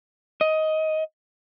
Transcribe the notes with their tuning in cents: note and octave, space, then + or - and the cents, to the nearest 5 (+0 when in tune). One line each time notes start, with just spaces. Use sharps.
D#5 +15